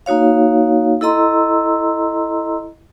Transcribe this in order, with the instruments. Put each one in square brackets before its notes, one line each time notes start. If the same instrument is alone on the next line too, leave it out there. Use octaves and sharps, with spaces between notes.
[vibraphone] A#3 D#4 F#4 C#5 F5
E4 A4 D#5 A#5 C6 E6